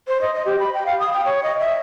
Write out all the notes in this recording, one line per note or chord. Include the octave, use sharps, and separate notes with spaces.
C5
D#5
D#5
G4
B5
G5
F5
D#6
G5
C#5
D#5
E5